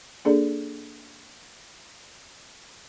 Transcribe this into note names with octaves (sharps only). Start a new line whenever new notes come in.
A#3 D4 G#4 A4 D5